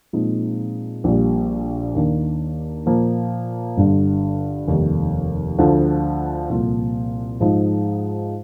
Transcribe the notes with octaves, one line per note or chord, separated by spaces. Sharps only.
A#2 F3 G#3 C4 D#4
A#1 A#2 G3
D#2 D#3 A#3 D4
A#2 F3 A#3
G1 G2 D3
F1 D#2 D#3 G3 A#3
D2 D3 F3
C2 A#2 F3 A#3 F4
G#2 F3 G#3 D#4